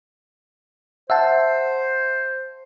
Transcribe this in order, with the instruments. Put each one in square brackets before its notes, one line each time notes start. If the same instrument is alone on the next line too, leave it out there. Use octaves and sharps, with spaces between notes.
[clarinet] C5 [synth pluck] E5 F#5 A5